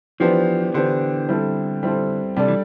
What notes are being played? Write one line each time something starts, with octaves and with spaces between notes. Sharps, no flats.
E3 F3 B3 D4 G4 C5
D3 E3 B3 D4 G4 C5
G3 C4 E4 A4 C5
G3 C4 E4 A4 C5
C3 G3 D4 A4 D5
E3